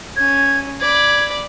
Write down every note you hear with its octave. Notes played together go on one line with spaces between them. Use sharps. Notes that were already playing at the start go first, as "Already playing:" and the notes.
C#4 G#6
D5 B5 G#6